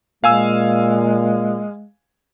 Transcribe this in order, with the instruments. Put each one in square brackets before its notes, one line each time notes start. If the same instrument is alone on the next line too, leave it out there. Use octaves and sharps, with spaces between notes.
[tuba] A#2 [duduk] G#3 [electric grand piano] F5 G#5 E6